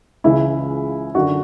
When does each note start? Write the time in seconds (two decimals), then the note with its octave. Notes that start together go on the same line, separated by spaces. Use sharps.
0.24 C#2 C#3 E3 E4
1.15 F#2 D3 F#4